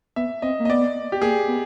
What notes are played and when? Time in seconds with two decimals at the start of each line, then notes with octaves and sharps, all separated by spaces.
0.16 B3 E5
0.42 C4 D#5
0.60 A#3
0.65 D#5
0.69 B3 D5
1.12 G4
1.21 A#3 G#4
1.48 B3